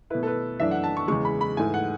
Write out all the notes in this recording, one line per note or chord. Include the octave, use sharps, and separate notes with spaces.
B2 A3 E4 B4
A4
B4
F#2 E3 A3 D4 E5
F#5
A5
C#6
E2 C#3 G#3 C#6
B5
B5
G#2 E3 A3 G#5
F#5